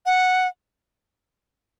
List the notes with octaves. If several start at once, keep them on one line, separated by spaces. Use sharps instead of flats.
F#5